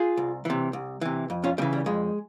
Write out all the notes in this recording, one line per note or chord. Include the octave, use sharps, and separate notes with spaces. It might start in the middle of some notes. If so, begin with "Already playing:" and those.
Already playing: F4 G#4
C2
C3 E3
C2
C3 E3
F2
C#4 F4
C#3 E3 G3
G3
F2 G#3